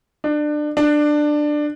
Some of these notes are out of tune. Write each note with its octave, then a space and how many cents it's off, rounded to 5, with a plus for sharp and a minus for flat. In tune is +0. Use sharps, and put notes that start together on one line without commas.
D4 +25
D4 +15